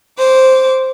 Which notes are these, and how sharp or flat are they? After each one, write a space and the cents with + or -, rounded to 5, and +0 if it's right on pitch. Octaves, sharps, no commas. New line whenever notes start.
C5 +0 D6 -25